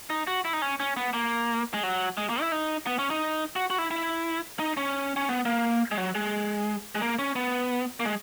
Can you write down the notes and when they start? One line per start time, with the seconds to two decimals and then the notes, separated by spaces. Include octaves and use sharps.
0.10 D#4
0.27 F#4
0.45 E4
0.53 D#4
0.62 C#4
0.80 C#4
0.97 B3
1.13 A#3
1.74 G#3
1.83 F#3
2.17 G#3
2.30 A#3
2.41 E4
2.52 D#4
2.87 B3
2.99 C#4
3.10 D#4
3.56 F#4
3.70 F#4
3.78 E4
3.91 E4
4.59 D#4
4.77 C#4
5.16 C#4
5.29 B3
5.45 A#3
5.91 G#3
5.97 F#3
6.15 G#3
6.95 G#3
7.02 A#3
7.19 C#4
7.36 B3
8.00 A#3
8.05 G#3